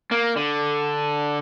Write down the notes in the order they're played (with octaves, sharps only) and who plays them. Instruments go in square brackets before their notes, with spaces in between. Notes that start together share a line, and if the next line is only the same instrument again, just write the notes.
[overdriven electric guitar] A#3
D3